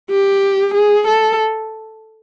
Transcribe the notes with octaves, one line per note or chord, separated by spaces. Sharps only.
G4
G#4
A4